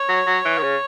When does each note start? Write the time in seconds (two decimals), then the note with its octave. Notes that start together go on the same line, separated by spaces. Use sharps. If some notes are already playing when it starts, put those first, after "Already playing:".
Already playing: C#5
0.09 F#3
0.27 F#3
0.45 E3
0.58 D#3
0.63 C#3